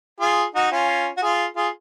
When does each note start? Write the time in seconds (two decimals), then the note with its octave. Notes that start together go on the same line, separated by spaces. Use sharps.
0.20 F4 G#4
0.55 D#4 F#4
0.72 C#4 F4
1.17 F#4
1.22 F4 G#4
1.56 F4 G#4